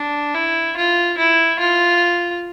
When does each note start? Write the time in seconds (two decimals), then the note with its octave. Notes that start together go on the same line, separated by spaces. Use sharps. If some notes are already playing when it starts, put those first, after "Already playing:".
Already playing: D4
0.34 E4
0.77 F4
1.18 E4
1.59 F4